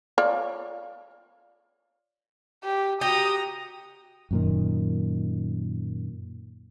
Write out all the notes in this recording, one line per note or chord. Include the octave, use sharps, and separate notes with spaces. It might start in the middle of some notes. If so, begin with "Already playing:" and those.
F4 C#5 D5
G4
F#4 G4 A#5 D#6
F#2 A#2 D#3